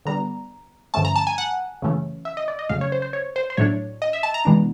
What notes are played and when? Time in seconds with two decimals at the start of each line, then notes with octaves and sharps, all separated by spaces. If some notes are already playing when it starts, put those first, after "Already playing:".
0.05 D3 G3 B3 D4 A#5
0.94 G2 D3 F3 A3 C#4 A5
1.05 A#5
1.16 A5
1.27 G#5
1.38 F#5
1.82 F#2 C#3 E3 A3 C#4
2.25 E5
2.37 D#5
2.48 D5
2.59 D#5
2.69 F2 C#3 F#3 A3 C#4 F5
2.81 C#5
2.92 C5
3.02 C5
3.13 C#5
3.36 C5
3.50 C5
3.57 A2 F#3 A3 D4 C#5
4.02 D#5
4.13 E5
4.23 A5
4.34 A#5
4.45 C3 E3 G#3 B3 D4